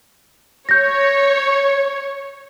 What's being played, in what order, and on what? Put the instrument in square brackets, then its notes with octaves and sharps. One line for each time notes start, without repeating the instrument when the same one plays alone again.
[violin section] C#5 [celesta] G6 A#6